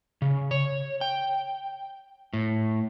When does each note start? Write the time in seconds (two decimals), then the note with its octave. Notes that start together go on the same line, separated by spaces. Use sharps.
0.22 C#3
0.51 C#5
1.01 G5
2.33 A2